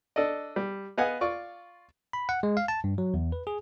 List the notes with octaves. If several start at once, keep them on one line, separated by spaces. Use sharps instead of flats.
D4 A4 D5 D#5
G3
B3 D#5 F5 F#5 G#5
F4 D5 C#6
B5
F#5
G#3
F5
A5
G2
F#3
E2
B4
G#4